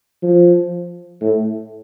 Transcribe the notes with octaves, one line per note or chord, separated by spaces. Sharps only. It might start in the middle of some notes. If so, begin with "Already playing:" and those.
F3
A2